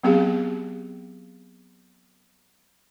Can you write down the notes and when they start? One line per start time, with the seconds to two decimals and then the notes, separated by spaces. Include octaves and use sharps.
0.03 F#3 B3 C4 G4 G#4 F5